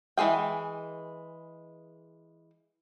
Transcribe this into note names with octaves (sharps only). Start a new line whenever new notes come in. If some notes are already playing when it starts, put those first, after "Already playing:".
E3 G#3 G#4 G5